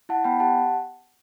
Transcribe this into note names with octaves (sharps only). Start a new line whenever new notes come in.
E4 F#5 A5
B3 G5 B5
G4 F#5 A5